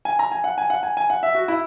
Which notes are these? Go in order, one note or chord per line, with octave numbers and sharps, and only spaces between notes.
G#5
A#5
G#5
F#5
G#5
F#5
G#5
G#5
F#5
E5
F#4
E4